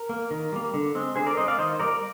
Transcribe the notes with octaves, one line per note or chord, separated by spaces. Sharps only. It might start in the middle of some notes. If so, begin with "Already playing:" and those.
Already playing: A#4
A#3
D#3
G3 A#3
D3
G#3 C4
D3 G#4 C5
A#4 D5
G#3 C4 C5 D#5
D5 F5
D#3 C5 D#5
G3 A#3 A#4 D5